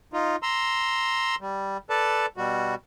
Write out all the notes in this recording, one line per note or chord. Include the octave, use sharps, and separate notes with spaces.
D#4 F4
A#5 C6 E6
G3
A4 B4 D5 A5
B2 G3 F#4